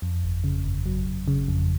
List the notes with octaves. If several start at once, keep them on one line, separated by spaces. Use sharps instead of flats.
F2
G1
C#3
G1
F#3
G1
C#3
F2